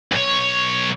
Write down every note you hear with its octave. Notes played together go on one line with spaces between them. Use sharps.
B1 C#5